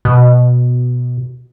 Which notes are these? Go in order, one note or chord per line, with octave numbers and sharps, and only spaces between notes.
B2